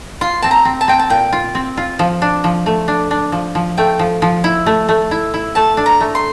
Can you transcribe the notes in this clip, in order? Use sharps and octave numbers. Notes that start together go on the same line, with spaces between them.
F4 C6
C4 A5
A#5
C4
A5
C4 G5
A5
A#2 G5
F4
C4
F4
F3
D4
F3
A3
D4
D4
F3
F3
A3 G5
F3
F3
E4
A3
A3
E4
E4
A3 A5
D4
A#5
A3
C6